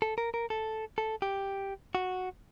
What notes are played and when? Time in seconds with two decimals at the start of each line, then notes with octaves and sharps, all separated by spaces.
0.02 A4
0.18 A#4
0.34 A#4
0.50 A4
0.98 A4
1.22 G4
1.95 F#4